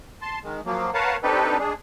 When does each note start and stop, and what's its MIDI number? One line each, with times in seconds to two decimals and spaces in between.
0.22 0.39 81
0.22 0.39 84
0.44 0.61 51
0.44 0.61 56
0.66 0.91 53
0.66 0.91 54
0.66 0.91 58
0.94 1.17 70
0.94 1.17 71
0.94 1.17 73
0.94 1.17 77
0.94 1.17 78
0.94 1.17 81
1.23 1.58 60
1.23 1.58 62
1.23 1.58 63
1.23 1.58 67
1.23 1.58 69
1.23 1.58 71
1.59 1.73 56
1.59 1.73 62
1.59 1.73 68